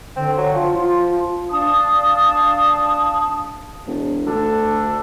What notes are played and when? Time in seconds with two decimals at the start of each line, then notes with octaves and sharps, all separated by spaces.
0.16 D3 C4
0.37 F#3
0.53 F3 F4
0.74 F4
1.50 D4 F5 A5 D#6
3.87 E1
4.26 D2 D4 A4